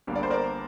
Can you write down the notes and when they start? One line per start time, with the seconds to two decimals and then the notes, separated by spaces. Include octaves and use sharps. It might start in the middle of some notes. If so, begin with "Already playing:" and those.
0.07 G1 G2 G3 A#3
0.15 D5
0.23 C5
0.30 A#4 D5